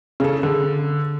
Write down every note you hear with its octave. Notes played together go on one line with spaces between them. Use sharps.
C#3 G#4 A4
D3